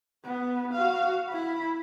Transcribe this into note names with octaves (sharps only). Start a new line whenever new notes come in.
B3
F#4 F5
E4 B5